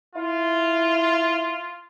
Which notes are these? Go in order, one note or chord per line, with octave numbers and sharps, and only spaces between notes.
E4 F4